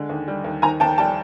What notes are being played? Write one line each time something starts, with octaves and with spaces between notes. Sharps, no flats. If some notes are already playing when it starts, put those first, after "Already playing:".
Already playing: D3 G#3
D#2
G3
D#2
D#3 G#5 A#5
D#2 G5 A5
G3 G5 A5